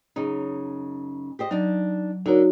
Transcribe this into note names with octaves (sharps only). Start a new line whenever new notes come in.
F#2 C#3 D#4
G4 C5 D#5
F#3 D4 D#4
D3 D#4 F#4 A#4 C#5